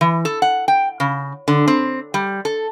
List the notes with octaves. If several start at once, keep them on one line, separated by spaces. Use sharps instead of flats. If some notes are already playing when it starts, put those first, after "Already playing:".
E3
A4
F#5
G5
C#3
D3
C4
G3
A4